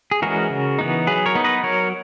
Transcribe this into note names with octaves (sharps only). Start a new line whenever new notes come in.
G#4
E3 G#3 C#4 F#4 A#4
C#3
E3 B3 D#4
F#3 G#4 B4
A#4 C#5
B3 D#4
B4 D#5
F#3 A#4 C#5